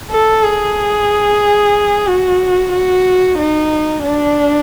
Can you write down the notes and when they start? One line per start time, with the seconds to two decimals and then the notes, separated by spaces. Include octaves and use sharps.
0.11 A4
0.44 G#4
2.07 F#4
2.73 F#4
3.38 D#4
4.03 D4